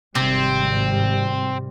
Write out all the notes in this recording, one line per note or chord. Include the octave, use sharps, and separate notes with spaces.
G#1 C3 G3 C4